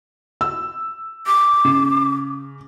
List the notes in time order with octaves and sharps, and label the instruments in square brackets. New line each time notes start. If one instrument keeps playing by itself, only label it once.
[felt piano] E6
[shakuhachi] D6
[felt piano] C#3